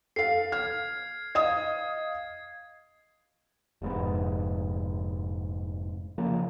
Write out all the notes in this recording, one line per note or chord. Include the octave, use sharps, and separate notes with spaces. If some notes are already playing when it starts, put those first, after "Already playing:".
A4 F5 C7
F6 G#6
D#5 F5 D#6 G#6
F1 G#2 B3
C#3 F3 A#3